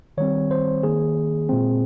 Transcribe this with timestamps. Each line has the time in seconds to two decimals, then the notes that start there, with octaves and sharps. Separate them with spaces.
0.17 D#3 G3 C4 C#5
0.51 C5
0.83 D#3 A#3 G#4
1.49 A#2 G#3 C4